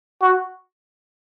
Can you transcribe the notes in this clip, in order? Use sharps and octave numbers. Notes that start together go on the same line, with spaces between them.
F#4